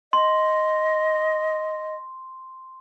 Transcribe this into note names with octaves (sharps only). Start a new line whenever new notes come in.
D#5 C6